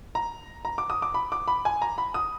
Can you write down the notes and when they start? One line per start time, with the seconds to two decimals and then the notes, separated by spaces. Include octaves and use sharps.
0.15 A#5
0.65 A#5
0.78 D6
0.90 D#6
1.02 D6
1.14 B5
1.32 D6
1.48 B5
1.65 G#5
1.82 A#5
1.98 B5
2.14 D#6